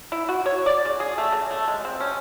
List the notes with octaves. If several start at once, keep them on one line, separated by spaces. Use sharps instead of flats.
E4
F#4
C#5
D5
C#3
G#4
A3
C#3
A3
G#3
C4
C#4